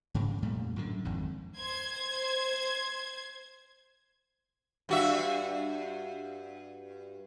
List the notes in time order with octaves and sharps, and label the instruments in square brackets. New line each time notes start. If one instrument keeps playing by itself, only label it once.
[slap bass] G#2 C#3
F2 A#2 G3 A3
F#2 A2 D3
G#1 F2 G#2
[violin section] C5 G#6
[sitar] G2 F#4 E5